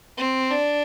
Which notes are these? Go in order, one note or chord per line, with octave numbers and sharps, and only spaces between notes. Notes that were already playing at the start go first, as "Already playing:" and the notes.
C4
D4